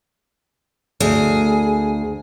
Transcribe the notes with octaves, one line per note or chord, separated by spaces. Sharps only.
D2 G#4